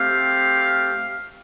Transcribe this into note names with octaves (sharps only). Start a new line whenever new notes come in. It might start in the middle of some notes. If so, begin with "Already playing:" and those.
Already playing: A3 C4 G4 F5